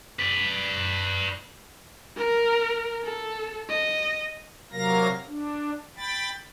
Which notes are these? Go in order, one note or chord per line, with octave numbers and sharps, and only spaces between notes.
B4 D5
A#4
A4
D#5
C3 F#3 A#3 A#4 F5 A#6
D4
G5 B5 A6